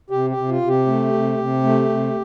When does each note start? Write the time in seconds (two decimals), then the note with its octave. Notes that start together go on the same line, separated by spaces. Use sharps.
0.10 C3 G4
0.30 G4
0.37 C3
0.49 F4
0.62 C3
0.68 G4
0.87 A3
1.13 C3
1.38 C3
1.63 A3
1.89 C3